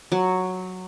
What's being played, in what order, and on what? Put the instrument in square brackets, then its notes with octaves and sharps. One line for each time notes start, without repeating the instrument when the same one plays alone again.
[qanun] F#3